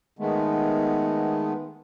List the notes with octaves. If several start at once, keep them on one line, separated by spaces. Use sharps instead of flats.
D#3 G#3 A3 B3